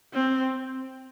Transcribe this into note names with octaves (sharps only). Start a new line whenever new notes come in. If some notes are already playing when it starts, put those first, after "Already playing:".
C4